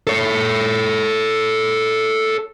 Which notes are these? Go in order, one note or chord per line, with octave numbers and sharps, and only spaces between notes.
A4 C#5